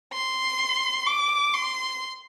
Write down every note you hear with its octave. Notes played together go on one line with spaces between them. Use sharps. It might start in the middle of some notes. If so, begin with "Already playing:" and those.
C6
D6
C6